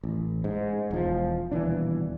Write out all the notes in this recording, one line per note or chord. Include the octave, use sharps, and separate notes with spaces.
A1
G#2
E1 F3
D#1 B2 E3 D4